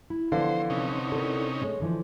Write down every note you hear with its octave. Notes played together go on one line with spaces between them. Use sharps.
E4
D3 E3 F3 B3 C5 F5
C3 C#4 D#4
A4 A#4
G#3 A3 C#5
D3 E3 F3